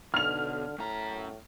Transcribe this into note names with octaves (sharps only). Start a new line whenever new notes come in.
B1 D3 F6 F7
F#2 A2 A#5